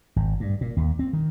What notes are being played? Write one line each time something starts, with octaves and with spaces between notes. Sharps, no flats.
G#1
G2
A#2
D#2
C4
D#3